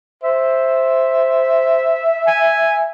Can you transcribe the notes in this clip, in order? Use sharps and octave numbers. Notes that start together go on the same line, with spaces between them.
C5 E5
G#5